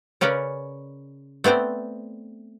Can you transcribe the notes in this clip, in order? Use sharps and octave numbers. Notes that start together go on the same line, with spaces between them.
C#3 C#4 A#4 B4 D5
A3 B3 C4 C5 D5